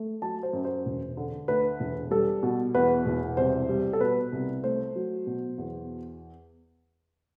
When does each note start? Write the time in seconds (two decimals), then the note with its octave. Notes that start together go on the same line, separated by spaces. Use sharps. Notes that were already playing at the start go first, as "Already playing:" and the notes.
Already playing: A3
0.22 F#3 A5
0.43 C5
0.53 F#2
0.65 C5
0.86 E1
1.17 D3
1.48 D2 B4
1.80 E1
2.11 G3 A4
2.43 B2
2.74 E2 B4
3.06 E1
3.37 C2 C5
3.69 G3
3.93 A4
4.00 B2 B4
4.32 C2
4.63 A3 C5
4.95 F#3
5.27 B2
5.58 E2